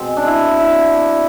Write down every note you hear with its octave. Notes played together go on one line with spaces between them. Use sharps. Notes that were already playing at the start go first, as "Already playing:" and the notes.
Already playing: B2 G#3 C4
D4
E4
E4